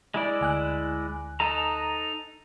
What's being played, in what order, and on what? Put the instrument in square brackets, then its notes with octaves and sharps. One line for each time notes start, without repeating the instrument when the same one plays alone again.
[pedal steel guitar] G#3 E4 D5
[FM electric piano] D2 G#5 F#6
[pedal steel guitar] D#4 A4 A#5